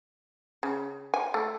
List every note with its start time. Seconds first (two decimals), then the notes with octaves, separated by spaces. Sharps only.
0.63 C#3
1.14 G#5
1.34 A3